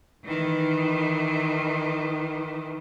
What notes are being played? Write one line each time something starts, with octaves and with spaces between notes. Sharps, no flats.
D#3 E3